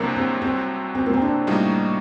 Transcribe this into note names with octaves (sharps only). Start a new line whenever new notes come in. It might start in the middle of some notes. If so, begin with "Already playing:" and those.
Already playing: C2 C3 F#3 A#3 C4 D4
C4
C4
C4
A#3
C4
D4
A2 G3 A#3 D#4 F#4